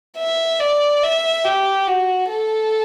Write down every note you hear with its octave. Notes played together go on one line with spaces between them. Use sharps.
E5
D5
E5
G4
F#4
A4